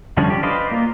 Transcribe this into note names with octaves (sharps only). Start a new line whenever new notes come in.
D3 F3 G3 C#4 D4
G4
B4 C5 D5 D#5 F5
A#3 F4